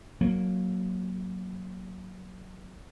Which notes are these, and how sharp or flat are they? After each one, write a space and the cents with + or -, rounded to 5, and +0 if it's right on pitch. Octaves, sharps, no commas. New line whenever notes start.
F#3 +0 A#3 +0